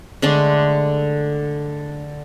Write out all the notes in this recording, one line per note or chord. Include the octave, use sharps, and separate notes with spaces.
D3 G#3 A3 D4